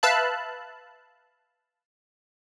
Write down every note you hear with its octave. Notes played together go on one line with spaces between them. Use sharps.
B4 E5 F5 A5 F#6